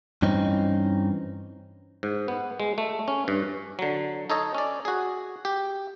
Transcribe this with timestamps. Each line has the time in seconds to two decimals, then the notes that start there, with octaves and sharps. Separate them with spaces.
0.22 G2 E3 C4 C#4 D#4
2.03 G#2
2.28 B3
2.60 G#3
2.78 A3
3.08 C#4
3.28 G2
3.79 D3 F#3
4.30 D#4 A4 C#5 D#5
4.55 C#4 D5
4.85 F#4 G#4
5.45 G4